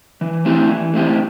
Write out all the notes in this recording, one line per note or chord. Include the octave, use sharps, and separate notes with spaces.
E3
A3 C4 E4 G4
E3
A3 C4 E4 G4